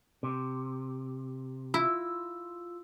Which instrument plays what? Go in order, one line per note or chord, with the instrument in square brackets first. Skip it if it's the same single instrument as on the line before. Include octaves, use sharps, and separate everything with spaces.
[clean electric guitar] C3
[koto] E4 [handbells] F4 E6